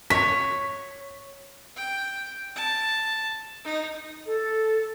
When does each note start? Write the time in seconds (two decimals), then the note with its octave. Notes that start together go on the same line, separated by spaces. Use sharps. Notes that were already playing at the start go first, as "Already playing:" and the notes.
0.10 C#5 B6
1.76 G5
2.56 A5
3.64 D#4
4.25 A4